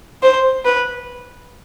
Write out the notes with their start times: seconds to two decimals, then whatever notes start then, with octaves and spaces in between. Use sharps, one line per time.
0.23 C5
0.65 B4